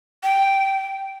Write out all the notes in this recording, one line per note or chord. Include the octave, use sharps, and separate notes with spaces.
G5